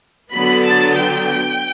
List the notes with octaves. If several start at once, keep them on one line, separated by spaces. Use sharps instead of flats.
D3 F#3 B3 B5
A5
G5